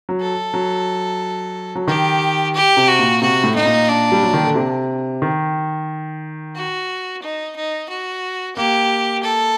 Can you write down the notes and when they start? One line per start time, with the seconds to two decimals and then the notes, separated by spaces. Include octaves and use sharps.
0.09 F#3
0.21 A4
0.54 F#3
1.75 F#3
1.87 D#3 G4
2.55 G4
2.77 C3
2.88 F#4
2.99 A#2
3.21 C3 F#4
3.44 A2
3.55 A2 D#4
3.66 A#2
3.88 D4
4.12 G3
4.23 F#3
4.34 D#3
4.44 D3
4.55 C3
5.22 D#3
6.56 F#4
7.22 D#4
7.56 D#4
7.89 F#4
8.56 A#3 G4
9.23 A4